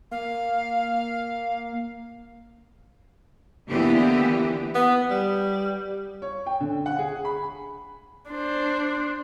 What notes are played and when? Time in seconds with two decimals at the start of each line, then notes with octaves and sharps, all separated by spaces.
0.11 A#3 F5
3.69 D3 E3 A#3 B3 G4
4.75 B3
5.10 G3
6.22 C#5
6.46 G5
6.60 D3
6.86 F#5
6.99 G#4
7.25 B5
8.31 D4 C5